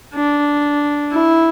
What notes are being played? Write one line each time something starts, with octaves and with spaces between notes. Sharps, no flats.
D4
E4